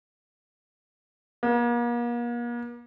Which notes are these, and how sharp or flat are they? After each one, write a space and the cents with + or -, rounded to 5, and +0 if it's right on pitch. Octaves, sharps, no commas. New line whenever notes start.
A#3 +40